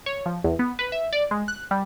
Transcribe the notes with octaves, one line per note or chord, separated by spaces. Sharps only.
C#5
F3
E2
B3
B4
E5
D5
G#3
F#6
G3